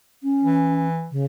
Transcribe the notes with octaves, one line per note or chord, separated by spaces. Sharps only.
C#4
E3
C#3